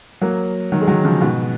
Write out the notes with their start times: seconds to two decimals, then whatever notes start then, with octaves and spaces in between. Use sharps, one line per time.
0.22 F#3 A#3
0.72 D#3 F#3
0.81 G#3
0.88 D#3 F#3
1.04 C#3 F3
1.21 G#2 B2